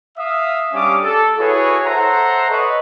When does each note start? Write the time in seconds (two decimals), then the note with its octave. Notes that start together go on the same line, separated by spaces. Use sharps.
0.18 E5 F5 D#6
0.73 G3 C#4 D4 F5 D6 D#6
1.03 A4
1.39 E4 F#4 G#4 B4 C#5
1.86 A4 C5 E5 F#5 A#5 C6
2.49 A4 B4 C#5 D#5